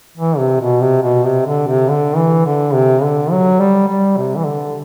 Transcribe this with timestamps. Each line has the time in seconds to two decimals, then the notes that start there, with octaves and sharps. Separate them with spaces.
0.18 E3
0.39 C3
0.60 B2
0.82 C3
1.03 B2
1.24 C3
1.46 D3
1.68 C3
1.89 D3
2.17 E3
2.45 D3
2.74 C3
3.03 D3
3.32 F#3
3.60 G3
3.88 G3
4.17 C3
4.38 E3
4.45 D3